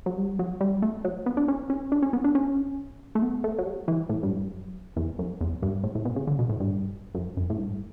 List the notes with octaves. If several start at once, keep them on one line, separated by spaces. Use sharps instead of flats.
F#3
G3
F#3
G3
A3
F#3
B3
D4
C#4
C#4
D4
C#4
B3
D4
C#4
A3
B3
A3
F#3
G3
E3
A2
G2
F#2
E2
F#2
E2
G2
A2
A2
B2
C#3
D3
B2
A2
G2
F#2
F#2
A2
G2